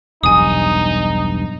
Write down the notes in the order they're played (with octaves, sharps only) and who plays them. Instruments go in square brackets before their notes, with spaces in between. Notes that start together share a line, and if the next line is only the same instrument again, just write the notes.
[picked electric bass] E1 B1 G2 [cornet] D#4 [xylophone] G#5 D#6